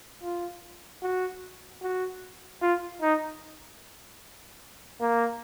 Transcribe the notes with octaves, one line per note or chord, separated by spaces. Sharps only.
F4
F#4
F#4
F4
D#4
A#3